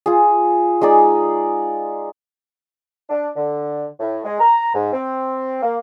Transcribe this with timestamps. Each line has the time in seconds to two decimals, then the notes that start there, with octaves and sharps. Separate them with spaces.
0.06 F4 G#4
0.81 G#3 D#4 G#4 D5
3.09 D4
3.35 D3
4.00 A2
4.24 G#3
4.40 A#5
4.74 G#2
4.93 C4
5.61 A#3